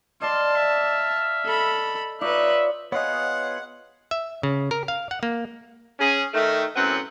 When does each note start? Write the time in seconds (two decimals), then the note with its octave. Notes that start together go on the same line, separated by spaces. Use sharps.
0.22 D5 D#5 F5 A5 C6
0.56 E5
1.45 A4 B5
2.21 D#4 F4 B4 C#5 D5 E5 F#6
2.92 B3 F4 G#4 C#5 D#5 F#5
4.11 E5
4.43 C#3
4.71 A#4
4.88 F5
5.11 F#5
5.23 A#3
5.99 C#4 G#4
6.33 D#3 A3
6.75 F#2 A2 B3 C4 F#5